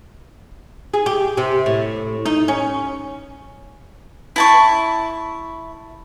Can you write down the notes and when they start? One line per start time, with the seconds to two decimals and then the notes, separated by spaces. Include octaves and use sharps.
0.94 G#4
1.06 G4
1.37 C3
1.66 A2
2.26 D#4
2.48 C#4
4.36 E4 A5 C#6